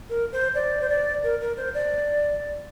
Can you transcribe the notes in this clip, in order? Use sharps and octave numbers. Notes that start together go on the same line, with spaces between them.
A#4
C5
D5
C5
D5
A#4
A#4
C5
D5